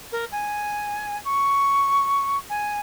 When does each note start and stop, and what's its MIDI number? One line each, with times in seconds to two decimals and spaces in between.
0.12 0.25 70
0.32 1.18 80
1.25 2.37 85
2.50 2.80 80